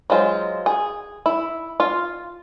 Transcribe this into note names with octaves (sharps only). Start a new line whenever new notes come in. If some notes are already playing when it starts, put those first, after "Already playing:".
F#3 G#3 F4 C5
G#4
E4
F4 F5